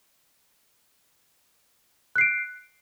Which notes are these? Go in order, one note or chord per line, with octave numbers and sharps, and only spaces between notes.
F#6 C7 D7